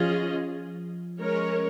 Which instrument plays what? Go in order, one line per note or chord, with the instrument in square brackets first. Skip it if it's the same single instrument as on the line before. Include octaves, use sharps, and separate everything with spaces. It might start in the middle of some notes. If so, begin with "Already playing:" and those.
Already playing: [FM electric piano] F3 [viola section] C#4 F4 G#4 D#5
[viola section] G#3 C#4 A#4 C#5